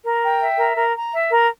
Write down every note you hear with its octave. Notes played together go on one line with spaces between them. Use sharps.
A#4
G5
E5
A#4
A#4
A#5
E5
A#4